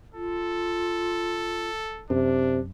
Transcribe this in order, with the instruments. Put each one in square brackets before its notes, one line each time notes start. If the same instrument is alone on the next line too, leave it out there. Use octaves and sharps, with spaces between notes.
[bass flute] F4 [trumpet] A4
[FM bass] F#2 [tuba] C3 [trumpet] D4